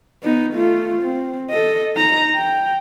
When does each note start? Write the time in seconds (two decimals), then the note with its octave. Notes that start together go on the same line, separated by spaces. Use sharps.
0.23 B3 D#4
0.53 A3 F4
1.02 C4
1.50 A4 D#5
1.96 D#4 A#5
2.35 G5